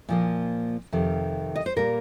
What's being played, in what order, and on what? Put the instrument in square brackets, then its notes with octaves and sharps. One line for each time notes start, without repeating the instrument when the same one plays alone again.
[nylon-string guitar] A#2 F3 A#3
F2 C3 D#3
D#5
C5
A#2 G3 A#3 A#4